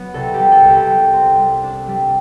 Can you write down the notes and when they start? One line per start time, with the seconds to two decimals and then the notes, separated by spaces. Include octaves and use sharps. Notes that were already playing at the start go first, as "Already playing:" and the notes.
Already playing: F#3 B3
0.14 C2 A4
0.34 G4
0.39 G3
0.52 A4
0.64 C2
0.70 G4
0.89 G3
1.13 C4
1.39 G3
1.63 D4
1.88 G3